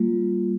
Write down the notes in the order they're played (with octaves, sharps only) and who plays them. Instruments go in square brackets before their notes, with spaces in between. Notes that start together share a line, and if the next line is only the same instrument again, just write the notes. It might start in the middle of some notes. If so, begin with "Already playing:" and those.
Already playing: [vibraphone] G3 A#3 F4